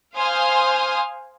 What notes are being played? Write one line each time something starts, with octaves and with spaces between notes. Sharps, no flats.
C5 F5 G#5 C6 D#6 F6